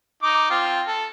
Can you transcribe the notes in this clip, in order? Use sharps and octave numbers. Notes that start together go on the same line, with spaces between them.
D#4 D6
C4 F4
A4